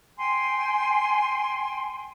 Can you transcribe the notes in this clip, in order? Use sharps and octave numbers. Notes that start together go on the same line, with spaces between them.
G5 G#5 C6